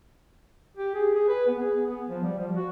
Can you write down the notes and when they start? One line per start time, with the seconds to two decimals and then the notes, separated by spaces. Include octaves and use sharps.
0.77 G4
0.95 G#4
1.14 G#4
1.28 B4
1.47 B3
1.59 G#4
1.87 B3
2.09 F3
2.23 G3
2.39 F3
2.55 F#4